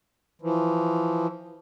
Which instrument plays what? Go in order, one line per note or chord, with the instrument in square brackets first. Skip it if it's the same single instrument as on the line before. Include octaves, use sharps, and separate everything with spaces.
[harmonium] E3 F3